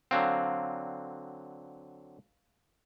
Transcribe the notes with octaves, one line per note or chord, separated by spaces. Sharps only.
D3 F#3 C4 F5 A#5